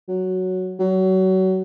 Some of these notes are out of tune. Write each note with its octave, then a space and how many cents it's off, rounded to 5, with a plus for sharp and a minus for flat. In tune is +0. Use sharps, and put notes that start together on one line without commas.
F#3 +0
F#3 +25